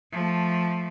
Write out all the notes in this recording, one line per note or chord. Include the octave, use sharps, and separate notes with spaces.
F3 A3